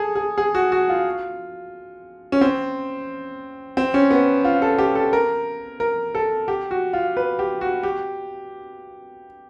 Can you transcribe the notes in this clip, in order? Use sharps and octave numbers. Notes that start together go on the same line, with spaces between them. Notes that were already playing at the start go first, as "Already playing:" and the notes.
Already playing: G#4 A4
G#4
G#4
F#4
F#4
F4
C#4
C4
C4
C#4
B3
F4
A4
G4
A4
A#4
A#4
A4
G4
F#4
F4
B4
G4
F#4
G4